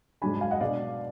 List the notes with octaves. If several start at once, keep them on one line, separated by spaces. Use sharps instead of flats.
G#2 F#3 D4 G#5 B5
F5 G#5
D#5 F#5
B2 G#3 D4 D5 F5